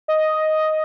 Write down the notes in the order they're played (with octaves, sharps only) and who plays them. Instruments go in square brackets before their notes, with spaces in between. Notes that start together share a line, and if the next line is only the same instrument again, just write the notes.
[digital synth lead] D#5